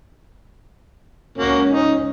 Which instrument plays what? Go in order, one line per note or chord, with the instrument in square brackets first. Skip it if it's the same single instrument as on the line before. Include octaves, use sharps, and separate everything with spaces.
[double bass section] C#2 C#4 [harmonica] A#3 F#4
[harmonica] D#4